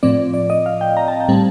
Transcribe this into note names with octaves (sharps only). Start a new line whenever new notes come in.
A2 F3 C4 D5
D5
D#5
F5
G5
A#5
A5
G5
A2 G3 C4 A5